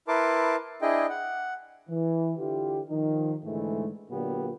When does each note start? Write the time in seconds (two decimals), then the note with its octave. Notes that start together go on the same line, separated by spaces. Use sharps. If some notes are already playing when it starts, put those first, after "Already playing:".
0.08 E4 A#4 B4 A5 C6 D6
0.82 D4 E4 G#4 D#5 G5
1.09 F#5
1.89 E3
2.38 D3 E4 F4 G4
2.90 D#3 F3 D#4
3.44 G#2 D3 E3 G#3 A3
4.10 A#2 D3 F#3 A#3 B3 G4